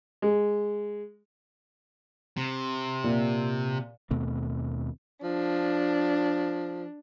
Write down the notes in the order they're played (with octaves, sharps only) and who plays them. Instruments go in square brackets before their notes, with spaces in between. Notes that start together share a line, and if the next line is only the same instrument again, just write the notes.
[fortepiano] G#3
[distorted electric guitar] C3
[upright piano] A#2
[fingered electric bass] D#2 B2 A3 C4
[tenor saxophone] F3 [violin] D4